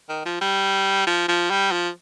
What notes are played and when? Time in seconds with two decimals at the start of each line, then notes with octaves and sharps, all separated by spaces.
0.09 D#3
0.26 F3
0.41 G3
1.07 F3
1.28 F3
1.50 G3
1.72 F3